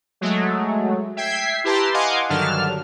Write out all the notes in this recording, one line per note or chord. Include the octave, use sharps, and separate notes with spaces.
F#3 G#3 A3
E5 G5 G#6 B6 C7
E4 G4 B4 A5 A#5 C6
D#5 F5 F#5 G#5 C6 D6
G2 D3 D#3 F#3 A5 F6